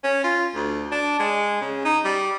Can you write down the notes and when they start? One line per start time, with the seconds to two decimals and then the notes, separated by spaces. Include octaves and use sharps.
0.04 C#4
0.24 F4
0.54 D2
0.91 D4
1.19 G#3
1.61 C#3
1.85 D#4
2.05 G3